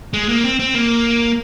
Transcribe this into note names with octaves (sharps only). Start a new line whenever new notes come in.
G#3
A#3
C4
C4
A#3